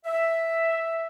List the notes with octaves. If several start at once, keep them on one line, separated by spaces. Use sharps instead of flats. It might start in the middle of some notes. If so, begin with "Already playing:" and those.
E5